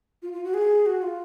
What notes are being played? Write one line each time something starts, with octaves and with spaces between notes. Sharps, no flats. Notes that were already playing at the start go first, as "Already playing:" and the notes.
F4
F4
F#4
G#4
F#4
F4